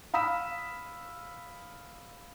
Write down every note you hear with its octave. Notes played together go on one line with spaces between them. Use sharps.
F5 B5 D#6 E6 B6 E7